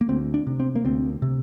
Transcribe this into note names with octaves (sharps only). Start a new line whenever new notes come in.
A#3
D2 C4
D4
C3
C4
A#3
D2 C4
C3